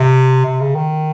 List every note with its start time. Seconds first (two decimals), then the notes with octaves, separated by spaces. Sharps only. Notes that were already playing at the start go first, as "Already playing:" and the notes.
Already playing: C3
0.45 C3
0.60 C#3
0.75 D#3